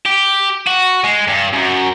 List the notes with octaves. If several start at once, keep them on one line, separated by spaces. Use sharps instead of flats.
G4
F#4
G#3
G2
F#2